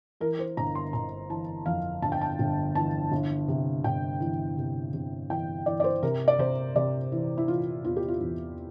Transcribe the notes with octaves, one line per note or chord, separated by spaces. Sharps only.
E3 A#4
C5
G1 A#5
C6
G1 A#5
E3 A5
F2 F5
G1 A5
G5
A5
G1
E3 A5
G1
C3
G1 G5
E3
C3
C3
E3 G5
E3 D5
D5
C5
C3 A#4
D5
C3 C5
C3 D5
E3
E4
E3 F4
E2 F4
G4
F4
E2